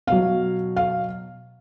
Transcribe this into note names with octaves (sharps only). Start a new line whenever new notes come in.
B2 F#3 F5
F5